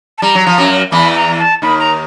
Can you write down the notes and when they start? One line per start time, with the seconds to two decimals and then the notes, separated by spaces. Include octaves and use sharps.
0.18 A5
0.22 G3 A#5
0.35 F#3
0.47 F3
0.58 F#2 F#3
0.92 E2 E3 B5
1.16 A#5
1.39 A5
1.62 D#2 D#3 B5
1.79 A#5